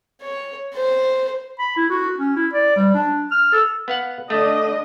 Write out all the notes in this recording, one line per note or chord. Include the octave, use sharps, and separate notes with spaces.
C#5
C5
B5
E4
F#4
C#4
E4
D5
G3
D4
F6
A4
B3 F5 F#5
D3 A3 D4 D#5